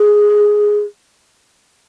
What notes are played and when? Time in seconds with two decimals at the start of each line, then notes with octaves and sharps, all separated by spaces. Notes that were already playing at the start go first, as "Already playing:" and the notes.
Already playing: G#4